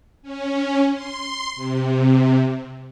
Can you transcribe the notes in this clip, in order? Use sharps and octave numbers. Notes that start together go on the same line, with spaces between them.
C#4
C6
C3